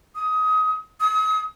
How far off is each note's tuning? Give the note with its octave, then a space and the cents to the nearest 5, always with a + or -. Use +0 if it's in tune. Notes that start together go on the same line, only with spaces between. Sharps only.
D#6 +20
D#6 +40